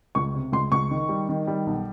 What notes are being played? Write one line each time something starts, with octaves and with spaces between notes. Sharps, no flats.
C#2 C#6
C3
C#2 C6
C#2 C#6
D#3
G3
D#3
G3
B1